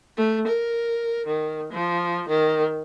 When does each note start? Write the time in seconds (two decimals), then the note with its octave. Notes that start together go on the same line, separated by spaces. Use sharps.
0.17 A3
0.47 A#4
1.26 D#3
1.72 F3
2.28 D#3